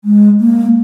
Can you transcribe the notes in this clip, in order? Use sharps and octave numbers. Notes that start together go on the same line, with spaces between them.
G#3
A#3